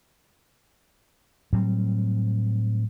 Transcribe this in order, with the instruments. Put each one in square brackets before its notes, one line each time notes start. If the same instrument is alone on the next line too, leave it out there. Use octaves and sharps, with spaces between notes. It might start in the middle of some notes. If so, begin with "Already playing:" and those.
[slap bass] A2 F#3 G3 C4